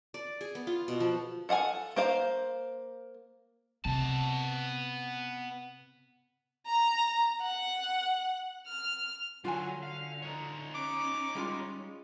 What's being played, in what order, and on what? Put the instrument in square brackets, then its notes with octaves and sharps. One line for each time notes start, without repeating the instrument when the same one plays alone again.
[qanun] D5
G#4
B3
F4
B2
F3
[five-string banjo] A4 F5 F#5 G#5
A#3 C5 F5
[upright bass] C3 [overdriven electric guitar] B3 A5
[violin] A#5
F#5
F6
[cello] D3 [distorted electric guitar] F#3 [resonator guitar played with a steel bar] F4 F#4 G#5
[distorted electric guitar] F5
D#4 C#5
[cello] C#4 [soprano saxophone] D6
[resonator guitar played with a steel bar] G3 G#3 F4